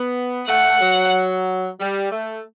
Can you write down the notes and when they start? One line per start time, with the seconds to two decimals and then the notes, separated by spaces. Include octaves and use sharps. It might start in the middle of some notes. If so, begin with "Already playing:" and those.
Already playing: B3
0.48 A3 F#5
0.81 F#3
1.80 G3
2.12 A3